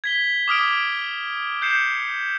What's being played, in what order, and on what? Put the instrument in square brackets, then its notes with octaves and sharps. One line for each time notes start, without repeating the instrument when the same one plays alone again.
[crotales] G#6 B6 G7
D6 D#6 F6 D7
G6 C7 C#7 E7